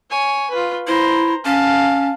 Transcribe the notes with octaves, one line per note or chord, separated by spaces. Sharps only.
C#5 G#5
F4 B4
E4 C5 A#5
C#4 F5 A5